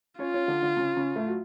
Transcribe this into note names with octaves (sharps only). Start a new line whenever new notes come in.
C#4 F4 C#5
C#4 C#5
D3 D4
D3 D4
C#3 C#4
C#3 C#4
A2 A3
F#3